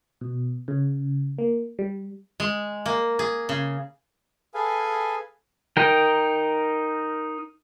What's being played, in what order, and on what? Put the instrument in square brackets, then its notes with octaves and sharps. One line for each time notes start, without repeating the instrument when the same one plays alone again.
[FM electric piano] B2
C#3
A#3
G3
[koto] G#3
A#3
G#4
C#3
[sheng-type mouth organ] G#4 A4 B4 F5 G#5
[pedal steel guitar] D#4 A#4 G5